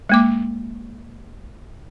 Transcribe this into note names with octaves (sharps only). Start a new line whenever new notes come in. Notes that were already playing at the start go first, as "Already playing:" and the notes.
G#3 A#3 D6